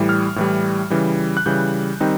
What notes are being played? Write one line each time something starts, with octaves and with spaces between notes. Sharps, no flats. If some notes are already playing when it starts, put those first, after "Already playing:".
Already playing: A2 E3 G3
F6
A2 E3 G3
C#3 E3 G3
F#6
C#3 E3 G3 G6
D#3 G3 C4 D#4